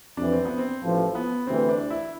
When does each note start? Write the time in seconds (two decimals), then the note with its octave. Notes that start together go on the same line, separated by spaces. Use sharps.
0.17 F2 C3 E3 D4
0.32 C4
0.45 B3
0.58 C4
0.82 A1 A2 F3
1.15 B3
1.47 D2 C3 E3 C4
1.69 D4
1.90 E4